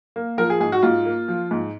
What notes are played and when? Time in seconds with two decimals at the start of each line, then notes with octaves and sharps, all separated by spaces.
0.16 A#3
0.38 F3 A#4
0.50 G#4
0.60 G#2 G#4
0.72 F#4
0.83 G#2 F4
1.05 A#3
1.28 F3
1.51 G#2